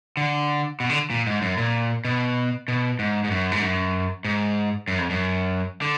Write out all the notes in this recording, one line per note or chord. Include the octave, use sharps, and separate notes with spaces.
D3
B2
D3
A#2
G#2
F#2
A#2
B2
B2
G#2
G#2
F#2
G#2
F#2
G#2
F#2
F2
F#2
D3